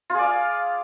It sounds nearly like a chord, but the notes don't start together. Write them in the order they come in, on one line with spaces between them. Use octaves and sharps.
F4 G#4 D5 F5